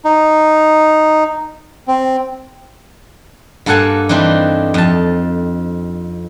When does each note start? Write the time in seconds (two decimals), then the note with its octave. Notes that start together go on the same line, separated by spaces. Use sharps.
0.05 D#4
1.88 C4
3.66 G2 A#3 A4 F#5 G#5 A5
4.09 E3 G3 C4 D4 D#4
4.74 F2 A5